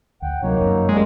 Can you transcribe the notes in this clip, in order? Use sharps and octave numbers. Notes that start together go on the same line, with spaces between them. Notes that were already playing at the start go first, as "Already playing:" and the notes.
D2 F#5 G5
C3 F#3 A#3 D#4 C#5
G1 F#2
G3 G#3 A#3 C#4